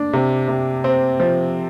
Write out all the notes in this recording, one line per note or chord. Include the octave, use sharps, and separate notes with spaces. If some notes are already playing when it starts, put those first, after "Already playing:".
Already playing: D4
C3
C3
C4
F3